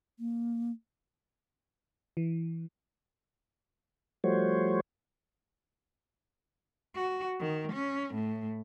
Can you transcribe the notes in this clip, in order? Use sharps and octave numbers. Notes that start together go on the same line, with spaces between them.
A#3
E3
F3 G3 A3 F#4 C5 C#5
F#4
D#3
C#4
A2